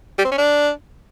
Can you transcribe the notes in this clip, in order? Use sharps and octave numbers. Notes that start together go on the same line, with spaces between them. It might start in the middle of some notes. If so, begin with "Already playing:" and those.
G3
C4
C#4
D4